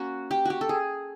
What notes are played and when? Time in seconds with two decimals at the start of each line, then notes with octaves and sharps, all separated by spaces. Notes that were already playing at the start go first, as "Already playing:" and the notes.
Already playing: A#3 C#4 F#4
0.31 G4
0.45 F#4 G4
0.61 A4
0.69 G#4